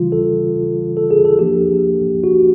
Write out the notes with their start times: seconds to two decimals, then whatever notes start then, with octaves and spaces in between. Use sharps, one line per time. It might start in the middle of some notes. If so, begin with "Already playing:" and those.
Already playing: C#3 E3 G3 F4
0.12 A4
0.97 A4
1.11 G#4
1.25 A4
1.39 F3 A#3 D4 G4
2.24 F#4